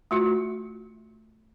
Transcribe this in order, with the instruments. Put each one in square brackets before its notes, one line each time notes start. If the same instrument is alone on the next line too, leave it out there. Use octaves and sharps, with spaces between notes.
[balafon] A3 F4 F#4